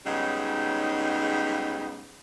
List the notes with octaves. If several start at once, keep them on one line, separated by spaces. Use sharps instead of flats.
G#2 C#3 F#3 G3 B3 D#4